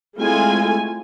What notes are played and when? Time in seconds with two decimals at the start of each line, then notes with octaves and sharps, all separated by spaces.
0.20 G#3 A3 C4 E4 F4 G#5